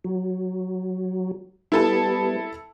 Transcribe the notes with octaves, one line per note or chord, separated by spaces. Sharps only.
F#3
G3 B3 E4 A4 A5